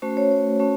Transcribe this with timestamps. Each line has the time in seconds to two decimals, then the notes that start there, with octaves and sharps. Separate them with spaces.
0.02 A3 C#4 F#4 C5
0.17 C#5
0.31 C#5
0.59 A3 C#4 F#4